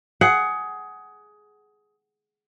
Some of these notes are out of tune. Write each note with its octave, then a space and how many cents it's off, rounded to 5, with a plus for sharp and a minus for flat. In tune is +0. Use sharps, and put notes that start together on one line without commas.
G#4 +15 F#5 +15